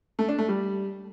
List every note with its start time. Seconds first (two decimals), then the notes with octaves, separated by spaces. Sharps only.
0.19 A3
0.29 D4
0.39 A3
0.48 G3